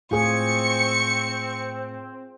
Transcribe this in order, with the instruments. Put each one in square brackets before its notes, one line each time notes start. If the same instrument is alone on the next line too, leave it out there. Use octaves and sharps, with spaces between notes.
[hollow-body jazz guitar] A2 [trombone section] C4 [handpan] F4 G#4 [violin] C#6 C#7